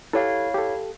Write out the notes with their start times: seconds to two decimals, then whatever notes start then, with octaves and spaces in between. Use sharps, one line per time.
0.13 E4 G4 A4 C#5 F5
0.54 G4 A4